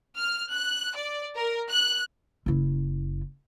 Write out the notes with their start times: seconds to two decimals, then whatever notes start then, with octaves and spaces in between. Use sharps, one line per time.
0.17 F6
0.52 F#6
0.95 D5
1.35 A#4
1.71 F#6
2.46 F#1 E4